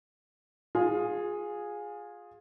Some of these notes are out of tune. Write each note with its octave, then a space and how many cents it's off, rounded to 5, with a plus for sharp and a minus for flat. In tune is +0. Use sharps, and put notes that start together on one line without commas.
F4 +25 G#4 -5